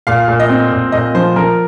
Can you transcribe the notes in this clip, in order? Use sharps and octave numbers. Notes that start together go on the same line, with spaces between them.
A#2 F5
A#2
D#5
C4
A#2
A#2 D#5
F3 C5
F3 A#4